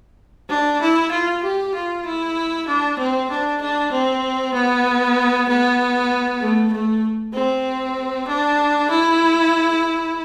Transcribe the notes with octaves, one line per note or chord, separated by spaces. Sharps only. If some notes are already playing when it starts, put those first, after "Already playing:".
D4
E4
F4
G4
F4
E4
D4
C4
D4
D4
C4
B3
B3
A3
A3
C4
D4
E4